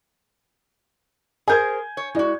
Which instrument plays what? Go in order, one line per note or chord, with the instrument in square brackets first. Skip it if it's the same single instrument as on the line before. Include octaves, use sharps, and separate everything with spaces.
[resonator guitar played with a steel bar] G#4 A#4 C5 [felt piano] G#5 G6 G#6
[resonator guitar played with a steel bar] C#5
[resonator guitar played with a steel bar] G#3 F#4 [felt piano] E4 D5